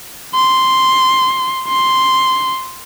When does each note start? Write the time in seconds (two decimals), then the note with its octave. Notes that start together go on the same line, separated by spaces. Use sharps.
0.35 C6
1.68 C6